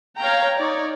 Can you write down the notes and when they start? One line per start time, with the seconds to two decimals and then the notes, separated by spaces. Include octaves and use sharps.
0.18 C#5 F5 G5 A#5
0.57 D#4 C#5 D5